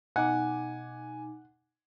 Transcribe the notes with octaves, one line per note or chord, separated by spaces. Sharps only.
B2 D#4 F#5 G#5 D6